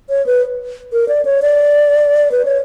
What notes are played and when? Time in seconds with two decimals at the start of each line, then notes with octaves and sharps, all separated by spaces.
0.10 C#5
0.26 B4
0.93 A#4
1.09 D5
1.25 C#5
1.42 D5
2.32 B4
2.45 C#5